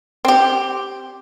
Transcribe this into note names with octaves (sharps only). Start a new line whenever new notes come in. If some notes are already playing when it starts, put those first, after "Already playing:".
C4 G4